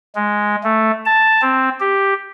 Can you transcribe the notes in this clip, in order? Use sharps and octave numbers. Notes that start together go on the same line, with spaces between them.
G#3
A3
A5
C4
G4